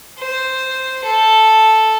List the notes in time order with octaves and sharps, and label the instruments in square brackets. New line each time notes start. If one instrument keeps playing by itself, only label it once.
[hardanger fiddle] C5
A4